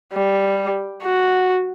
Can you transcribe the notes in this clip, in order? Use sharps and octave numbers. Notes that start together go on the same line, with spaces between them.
G3
F#4